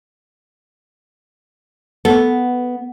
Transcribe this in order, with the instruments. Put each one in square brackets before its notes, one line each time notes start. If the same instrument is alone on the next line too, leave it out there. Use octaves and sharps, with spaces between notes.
[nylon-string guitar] B3 [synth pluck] A4